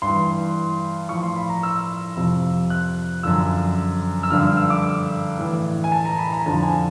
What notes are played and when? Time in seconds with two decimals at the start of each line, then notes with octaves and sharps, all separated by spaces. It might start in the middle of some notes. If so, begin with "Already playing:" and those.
0.02 G2 E3 C6
1.09 A2 F3 C#6
1.23 C6
1.36 B5
1.49 A#5
1.63 E6
2.16 F2 C3 F3
2.70 F#6
3.23 F#2 D3 F3 E6
4.23 E6
4.30 G2 D3 F3 F6
4.57 E6
4.70 D6
5.38 A2 E3
5.84 G#5
5.92 A5
6.05 A#5
6.18 B5
6.32 A#5
6.45 F2 D3 F3 A5
6.63 G#5